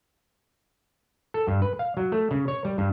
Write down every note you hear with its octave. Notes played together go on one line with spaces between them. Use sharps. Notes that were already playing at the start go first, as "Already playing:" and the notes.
A4
G2
B4
F5
F#3
A3
C#3
C#5
G3
G2